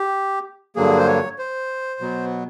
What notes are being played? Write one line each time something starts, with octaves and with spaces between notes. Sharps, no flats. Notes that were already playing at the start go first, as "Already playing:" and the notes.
Already playing: G4
G2 D3 F#3 A#3 G#4
C5
C#5
C5
B2 F#3 B3